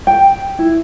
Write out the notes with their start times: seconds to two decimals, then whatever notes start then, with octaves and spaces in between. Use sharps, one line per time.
0.07 G5
0.59 E4